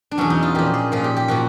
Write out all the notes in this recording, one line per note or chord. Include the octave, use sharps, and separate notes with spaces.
D4
E2 B2 F#3 C#4
D#4
F4
A#2 F3 G4
G#4
A#2 F3 G#4
G4
G4
A#2 F3 F#4